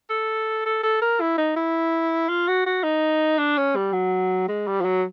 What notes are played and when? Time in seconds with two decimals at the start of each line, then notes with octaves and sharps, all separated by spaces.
0.10 A4
0.66 A4
0.83 A4
1.01 A#4
1.20 E4
1.38 D#4
1.56 E4
2.29 F4
2.48 F#4
2.66 F#4
2.83 D#4
3.38 D4
3.57 C#4
3.76 G3
3.93 F#3
4.48 G#3
4.67 G3
4.80 F3
4.84 F#3